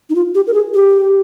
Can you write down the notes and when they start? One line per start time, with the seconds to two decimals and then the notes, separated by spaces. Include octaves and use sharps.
0.10 D#4
0.15 F4
0.35 G4
0.47 A#4
0.54 G#4
0.74 G4